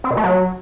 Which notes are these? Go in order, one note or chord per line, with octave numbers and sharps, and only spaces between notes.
C4
B2
A3
F#3